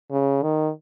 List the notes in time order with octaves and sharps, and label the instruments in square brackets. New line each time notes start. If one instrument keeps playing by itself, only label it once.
[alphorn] C#3
D#3